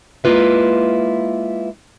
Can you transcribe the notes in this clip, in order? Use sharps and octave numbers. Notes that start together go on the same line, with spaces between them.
G#3 A#3 E4 F4 B4 E5